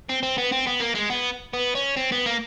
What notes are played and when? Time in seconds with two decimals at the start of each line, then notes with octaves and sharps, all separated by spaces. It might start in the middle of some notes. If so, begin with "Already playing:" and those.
0.10 C4
0.23 C4
0.38 B3
0.52 C4
0.67 B3
0.81 A#3
0.95 G#3
1.10 B3
1.53 B3
1.75 C#4
1.97 C4
2.12 B3
2.26 A#3